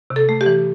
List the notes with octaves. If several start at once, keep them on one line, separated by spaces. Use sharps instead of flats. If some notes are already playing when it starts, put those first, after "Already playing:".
C3
A4
A3
G4
E3